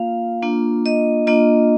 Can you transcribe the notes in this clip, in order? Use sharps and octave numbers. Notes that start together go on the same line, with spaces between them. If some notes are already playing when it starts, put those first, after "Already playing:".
Already playing: A#3 F4 F5
A#3 D4 F4
D#5
A#3 D4 F4 D#5